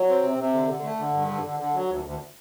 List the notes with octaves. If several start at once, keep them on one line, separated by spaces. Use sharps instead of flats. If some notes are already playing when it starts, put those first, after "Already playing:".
Already playing: F#3
C4
C3
C3
D3
D3
A3
D3
G2
D3
D3
D3
F#3
D2
D2